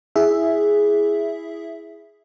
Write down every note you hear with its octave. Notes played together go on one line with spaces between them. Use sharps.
E4 G#4 E5